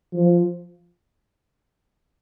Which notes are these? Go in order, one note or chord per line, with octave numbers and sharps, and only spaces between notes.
F3